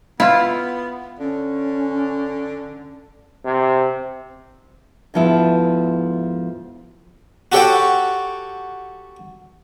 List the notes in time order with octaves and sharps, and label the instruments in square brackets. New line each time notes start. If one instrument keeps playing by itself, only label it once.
[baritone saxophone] B3 [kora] E4 F4 [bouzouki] F5
[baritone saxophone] D3 [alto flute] C#4
[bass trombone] C3
[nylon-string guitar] D2 G#2 F3 B3 E4
[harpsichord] F#4 G4 A4 C#5 F#5 G5